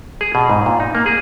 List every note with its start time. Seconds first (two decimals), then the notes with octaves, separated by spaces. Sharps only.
0.21 G#4
0.35 B2
0.50 G#2
0.66 A#2
0.80 D#4
0.95 A#3
1.06 G#4